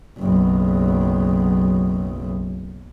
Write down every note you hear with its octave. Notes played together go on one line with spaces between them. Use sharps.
F#1 B1